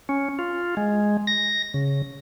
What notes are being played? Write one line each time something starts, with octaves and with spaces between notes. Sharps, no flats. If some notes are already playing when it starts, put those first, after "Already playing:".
C#4
F4
G#3
A#6
C#3